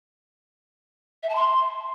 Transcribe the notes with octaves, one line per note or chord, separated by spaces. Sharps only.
E5
A5
C6